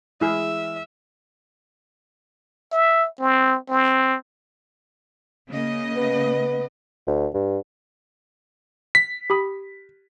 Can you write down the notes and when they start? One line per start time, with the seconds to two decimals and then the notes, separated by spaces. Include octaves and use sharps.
0.21 E3 G#3 E4 G#4 E5 F6
2.72 E5
3.20 C4
3.69 C4
5.49 C#3 A#3 D#5
5.96 B3
7.07 D2
7.34 G2
8.95 B6
9.30 G4 B5 D#6